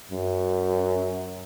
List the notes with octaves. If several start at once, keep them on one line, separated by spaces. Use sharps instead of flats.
F#2